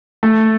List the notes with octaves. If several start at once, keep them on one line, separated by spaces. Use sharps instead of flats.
A3